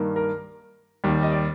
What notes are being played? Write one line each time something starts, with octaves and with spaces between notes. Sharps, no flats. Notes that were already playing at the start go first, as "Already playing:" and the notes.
Already playing: G2 D#3 A#3
A#4
D#2 D#3 G3
D#5
D5